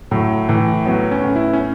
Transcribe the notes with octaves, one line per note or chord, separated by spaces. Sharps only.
A2 F#3
A2 E3
F#3 B3
C#4
A2
E4
C#4